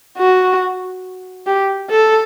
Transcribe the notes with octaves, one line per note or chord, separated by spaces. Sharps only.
F#4
G4
A4